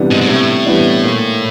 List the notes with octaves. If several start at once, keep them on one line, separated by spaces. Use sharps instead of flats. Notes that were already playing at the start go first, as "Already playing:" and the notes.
Already playing: C3 E3 G3 B3 D4
G#2
G#2
A2 C3
E3 G3 B3 D4
A#2